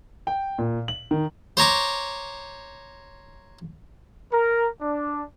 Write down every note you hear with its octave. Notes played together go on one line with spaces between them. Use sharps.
G5
A#2
F#7
D#3
C5 C#5 A#5 D6
A#4
D4